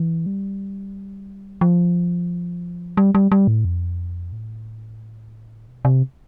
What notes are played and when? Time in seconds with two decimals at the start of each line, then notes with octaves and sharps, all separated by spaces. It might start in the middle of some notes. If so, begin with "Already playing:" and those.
Already playing: E3
0.26 G3
1.61 F3
2.97 G3
3.15 G3
3.32 G3
3.47 A2
3.65 F2
4.32 A2
5.68 B2
5.85 C3